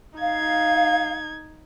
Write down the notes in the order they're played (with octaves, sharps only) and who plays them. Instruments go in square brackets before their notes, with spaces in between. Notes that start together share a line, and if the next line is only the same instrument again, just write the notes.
[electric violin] D#4 G#6 [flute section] F5